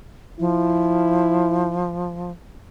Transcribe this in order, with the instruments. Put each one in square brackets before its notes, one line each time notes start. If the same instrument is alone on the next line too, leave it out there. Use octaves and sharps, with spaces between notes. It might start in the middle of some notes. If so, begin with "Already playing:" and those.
[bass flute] F3 [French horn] E4